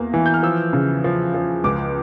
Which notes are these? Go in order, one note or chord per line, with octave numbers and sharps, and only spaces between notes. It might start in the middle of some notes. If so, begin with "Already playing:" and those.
Already playing: E2 A#3
E3
G6
F6
F3 E6
C#3
F3
F3
C#2 D6